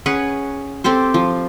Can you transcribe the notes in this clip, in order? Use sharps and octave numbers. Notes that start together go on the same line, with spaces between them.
C#4 G#4 B4 F#5
C4 G4 A4 C5
F3